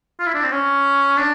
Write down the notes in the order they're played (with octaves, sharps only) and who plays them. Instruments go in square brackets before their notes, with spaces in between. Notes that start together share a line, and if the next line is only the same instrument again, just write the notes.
[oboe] F4
E4
D4
C4
C#4
D4